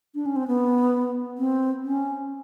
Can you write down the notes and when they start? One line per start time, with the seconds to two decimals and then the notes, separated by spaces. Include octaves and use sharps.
0.15 D4
0.26 C#4
0.36 C4
0.48 B3
1.38 C4
1.84 C#4